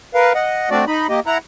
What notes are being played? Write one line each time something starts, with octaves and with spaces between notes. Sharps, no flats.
A#4 B4 F5
D#5 F#5
A3 C4 D4 F#4 D5
D#4 D#5 B5
A#3 G4 D#5
E4 F#5 A#5